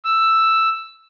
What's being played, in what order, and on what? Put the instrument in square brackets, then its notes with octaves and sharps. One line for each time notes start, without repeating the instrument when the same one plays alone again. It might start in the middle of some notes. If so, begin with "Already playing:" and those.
[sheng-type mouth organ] E6